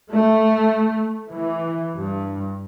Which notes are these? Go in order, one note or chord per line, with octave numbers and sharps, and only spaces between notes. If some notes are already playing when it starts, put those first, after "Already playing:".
A3
E3
G2